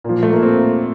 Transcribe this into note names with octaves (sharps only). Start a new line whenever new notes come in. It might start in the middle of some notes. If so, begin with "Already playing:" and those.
A#2 F3 A#3
A3
A#3
C4